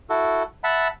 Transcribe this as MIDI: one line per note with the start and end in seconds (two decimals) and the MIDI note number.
0.09 0.43 64
0.09 0.43 66
0.09 0.43 69
0.64 0.88 76
0.64 0.88 78
0.64 0.88 81
0.64 0.88 83